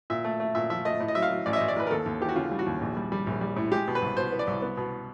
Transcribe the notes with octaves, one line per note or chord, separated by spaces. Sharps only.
A#2 E5
A3
A3
A#2 E5
F3 E5
A3 D#5
A2
D#5
F#3 E5
F5
F#3
A1 D5
E5
A1 D#5
D5
A1 B4
A#4
D#2 A4
D#2
E3 G4
F#4
C#3 F4
G3
F#4
D#2
A#1
G3
G3
A#1
G3
A2
G#3 G4
B2
B4
C2
B2 C5
B3
D5
C2
B3
B2